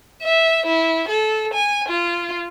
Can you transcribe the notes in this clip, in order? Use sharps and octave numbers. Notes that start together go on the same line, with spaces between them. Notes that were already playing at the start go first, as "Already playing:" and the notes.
E5
E4
A4
G#5
F4